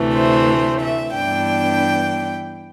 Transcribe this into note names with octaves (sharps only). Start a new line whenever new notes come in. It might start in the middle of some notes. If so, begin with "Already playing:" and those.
Already playing: D2 C3 E3 A3
C5
E5
G2 E3 B3 D4 G5